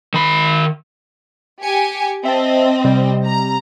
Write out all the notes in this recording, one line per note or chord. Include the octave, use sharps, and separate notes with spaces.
D#3 B5
G4 G#5 C#7
C4 D#5 E5 A5
C3 G3
A#5